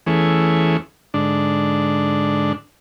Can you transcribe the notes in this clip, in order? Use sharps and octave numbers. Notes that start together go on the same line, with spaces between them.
E2 E3 A3 C#4 G#4
G#2 D3 D4